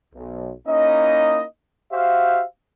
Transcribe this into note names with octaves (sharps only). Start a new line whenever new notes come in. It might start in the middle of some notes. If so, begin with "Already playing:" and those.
B1
A#3 C#4 D#4 E4 D#5
F#4 G4 C5 E5 F5